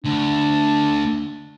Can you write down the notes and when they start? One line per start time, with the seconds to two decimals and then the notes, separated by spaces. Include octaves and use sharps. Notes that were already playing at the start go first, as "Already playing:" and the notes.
0.04 D2 D4